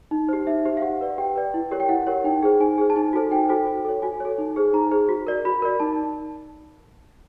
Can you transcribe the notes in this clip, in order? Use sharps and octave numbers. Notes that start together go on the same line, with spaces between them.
D#4
G4 C5
D#4 E5
G4 C5
F5
G4 F#5
B4 D5
G4 G5
B4 D5
E4
G4 A#4 C#5
G5
E4 F#5
G4 A#4 C#5
D#4 G5
G#4 C5
D#4 G#5
G#4 C5
A5
D#4 G#5
F#4 A4 C5
D#4 G5
F#4 A4 C5
F#4
A4 C#5
F#4 G#5
A4 C#5
D#4
G#4 C5
D#4 A#5
G#4 C5
F#4
A#4 D5
F#4 B5
A#4 D5
D#4 A5